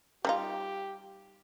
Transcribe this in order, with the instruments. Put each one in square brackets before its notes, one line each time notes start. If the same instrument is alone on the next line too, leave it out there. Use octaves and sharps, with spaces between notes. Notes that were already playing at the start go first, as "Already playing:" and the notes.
[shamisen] G3 D#4 F4 [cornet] G4